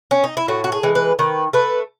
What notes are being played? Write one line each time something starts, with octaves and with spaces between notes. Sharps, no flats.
C#4
D#4
E4
A2 F#4
F#4
G#4
E3 G#3
B4
D#3 B4
A3 B4